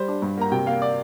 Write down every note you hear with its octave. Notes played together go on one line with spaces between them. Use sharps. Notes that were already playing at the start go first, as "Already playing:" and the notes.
Already playing: G3 C5
D4
G2
A#3 A#5
C3 G5
A#3 F5
D5